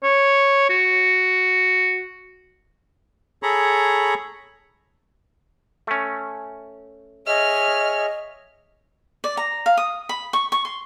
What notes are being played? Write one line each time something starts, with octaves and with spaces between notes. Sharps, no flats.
C#5
F#4
G#4 A4 C#5 A#5 B5 C#6
A3 C#4
G#4 C#5 D#5 E5 F6
D5
A#5
F5
D#6
B5
C#6
C#6
C6